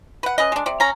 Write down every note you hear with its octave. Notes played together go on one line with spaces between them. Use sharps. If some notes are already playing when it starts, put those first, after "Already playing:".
B4 F#5
C#4 B4 D#5
G#3 D4
C3 D5
C#4 A#5